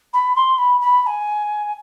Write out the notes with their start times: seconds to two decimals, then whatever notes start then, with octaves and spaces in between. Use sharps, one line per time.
0.13 B5
0.35 C6
0.58 B5
0.81 B5
1.03 B5
1.06 G#5